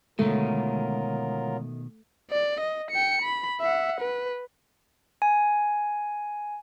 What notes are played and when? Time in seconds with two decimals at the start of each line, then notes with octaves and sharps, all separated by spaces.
0.19 B2 D3 D#3 F#3 G#3 A3 F4 A#4
2.31 D5
2.60 D#5
2.90 G5 C#7
3.22 B5
3.61 E5 F#5
4.01 B4
5.22 G#5